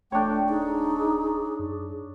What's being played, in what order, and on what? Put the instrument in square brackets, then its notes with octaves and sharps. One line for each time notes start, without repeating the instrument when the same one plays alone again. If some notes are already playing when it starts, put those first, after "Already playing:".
[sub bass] D1 [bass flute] A3 [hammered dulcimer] D4 C#5 [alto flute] G5
[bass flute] D#4 [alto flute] G#4
[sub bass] F#2